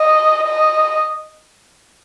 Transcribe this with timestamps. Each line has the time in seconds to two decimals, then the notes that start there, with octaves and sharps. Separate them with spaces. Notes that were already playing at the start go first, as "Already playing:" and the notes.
Already playing: D#5
0.47 D#5